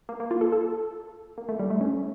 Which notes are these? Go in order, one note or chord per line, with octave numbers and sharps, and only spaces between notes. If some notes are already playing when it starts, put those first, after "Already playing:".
A#3
A#3
F4
A4
A4
A#3
A3
G3
A3
C#4